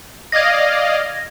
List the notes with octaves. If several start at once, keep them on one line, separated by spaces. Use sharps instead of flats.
D5 D#5 F5 G#6 A#6